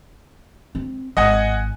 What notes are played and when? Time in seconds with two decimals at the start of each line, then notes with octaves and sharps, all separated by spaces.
0.75 C4
1.17 G#1 D#5 F#5 G#5